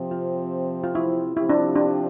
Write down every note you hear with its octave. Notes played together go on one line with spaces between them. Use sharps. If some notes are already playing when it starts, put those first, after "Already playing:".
Already playing: C3 F3 C4
F4
F4
E4
C3 F3 C4 E4 G4
D4
D4